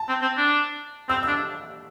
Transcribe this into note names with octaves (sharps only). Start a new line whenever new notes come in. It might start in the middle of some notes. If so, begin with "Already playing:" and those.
Already playing: A5
C4
C4
D4
C4 E6
D4 E6